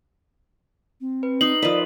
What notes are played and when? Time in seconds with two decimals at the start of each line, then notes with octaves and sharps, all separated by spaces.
1.01 C4
1.23 B4
1.41 D#4 D#6 C7 F#7
1.62 F3 A#4 B4 D5 D#5